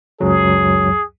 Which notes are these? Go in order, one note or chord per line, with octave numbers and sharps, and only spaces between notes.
C#2 F#2 F#3 G#4